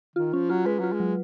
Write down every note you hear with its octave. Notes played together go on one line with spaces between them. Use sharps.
D#3 F4
F3 C#4
F#3 F4
G#3 B4
F#3 F4
G#3
F#3